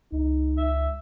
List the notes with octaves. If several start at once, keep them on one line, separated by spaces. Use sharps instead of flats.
C#2 D#4
E5